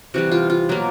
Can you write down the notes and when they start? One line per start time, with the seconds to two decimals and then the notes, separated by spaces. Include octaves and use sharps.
0.14 C3 E3 G3 F#4
0.31 F4
0.50 F4
0.69 B2 F#3 A#3